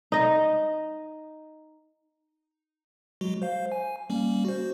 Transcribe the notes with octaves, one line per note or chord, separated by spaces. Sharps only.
D#4 D#5
F#3 G#3 F#4
C5 F5
G#5
G3 A#3 C#4
F#4 C5